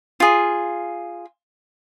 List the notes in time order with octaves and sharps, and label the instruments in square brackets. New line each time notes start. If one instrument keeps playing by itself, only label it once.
[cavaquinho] F4 G#4